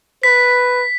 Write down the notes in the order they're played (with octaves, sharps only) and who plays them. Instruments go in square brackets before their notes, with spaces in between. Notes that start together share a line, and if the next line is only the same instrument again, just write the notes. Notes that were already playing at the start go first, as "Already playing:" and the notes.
[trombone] B4 [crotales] B6